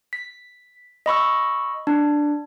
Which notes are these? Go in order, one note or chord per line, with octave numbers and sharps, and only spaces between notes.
B6
D#5 B5 C#6 E6
D4